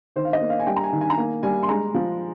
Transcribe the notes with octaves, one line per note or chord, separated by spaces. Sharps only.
D#3 C5
F5
D#5
A#3
F5
G#5
G3 G5
A#5
G#5
D#3
G#5
A#5
A#3 G#5
G3 G#5
C6
G#3 A#5
F3